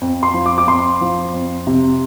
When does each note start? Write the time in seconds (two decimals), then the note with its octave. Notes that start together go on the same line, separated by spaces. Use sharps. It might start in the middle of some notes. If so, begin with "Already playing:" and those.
0.01 F2
0.23 C6
0.34 F3
0.46 D6
0.58 D6
0.67 F2 C6
1.01 F3
1.33 F2
1.67 C3